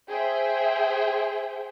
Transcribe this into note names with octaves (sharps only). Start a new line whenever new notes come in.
G#4 C5 E5 G5